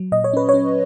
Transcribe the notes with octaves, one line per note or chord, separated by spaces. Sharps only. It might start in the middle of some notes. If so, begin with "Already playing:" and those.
Already playing: F#3
A#2 D#5
C#5
C#4 B4
C#5
C#4